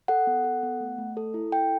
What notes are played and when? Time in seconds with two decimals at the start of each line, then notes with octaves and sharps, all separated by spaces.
0.08 A4 F#5
0.27 B3
0.44 A4
0.63 B3
0.80 A3
0.98 A3
1.17 A4
1.34 E4
1.52 A4 G5